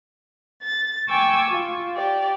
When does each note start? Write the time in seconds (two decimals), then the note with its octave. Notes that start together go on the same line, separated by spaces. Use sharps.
0.62 A6
1.08 G5 G#5 C#6 D6 E6 G#6
1.50 F4
1.95 G4 D5